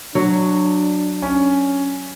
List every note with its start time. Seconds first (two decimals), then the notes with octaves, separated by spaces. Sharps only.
0.15 F#3 D4
1.22 C#4